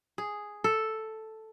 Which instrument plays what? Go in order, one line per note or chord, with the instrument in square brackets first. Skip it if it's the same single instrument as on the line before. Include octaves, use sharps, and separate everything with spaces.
[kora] G#4
A4